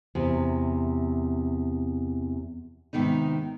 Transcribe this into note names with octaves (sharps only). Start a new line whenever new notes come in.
E2 C3
G#2 C3 D#3 B3 D#4